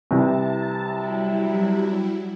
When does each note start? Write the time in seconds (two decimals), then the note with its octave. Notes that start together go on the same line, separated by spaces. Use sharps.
0.11 C2 C3 E3 A5
0.90 F#3 G3 E4